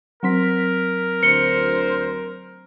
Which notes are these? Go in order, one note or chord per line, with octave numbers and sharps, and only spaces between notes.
F#3 C4 A#4 B6
D2 C5 C#7 G7